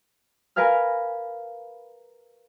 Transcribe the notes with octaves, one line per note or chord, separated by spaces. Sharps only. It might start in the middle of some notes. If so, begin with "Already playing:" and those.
A#4 B4 F5 G#5 F6